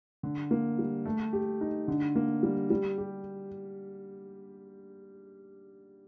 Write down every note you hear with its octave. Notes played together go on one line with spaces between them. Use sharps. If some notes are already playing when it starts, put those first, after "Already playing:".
D3
A#3
G3
A3
G4
D#4
D3
A#3
G3
G3
G4